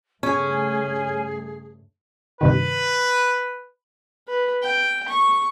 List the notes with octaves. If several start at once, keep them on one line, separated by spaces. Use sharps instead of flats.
G2 C#3 A3 C#4 G#4 G#5
G2 C3 D#3 B4
B4
G5
C#6